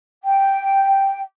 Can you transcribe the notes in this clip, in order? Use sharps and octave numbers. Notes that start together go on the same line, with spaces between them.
G5